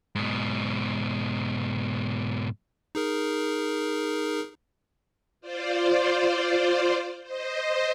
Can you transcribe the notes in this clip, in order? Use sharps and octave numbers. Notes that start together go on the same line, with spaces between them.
G#2 B2
D#4 G#4 A#4
F4 C5 D5
C5 D#5